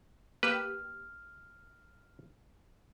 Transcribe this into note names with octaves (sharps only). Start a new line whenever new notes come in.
A#3 G4 B4 E6 F6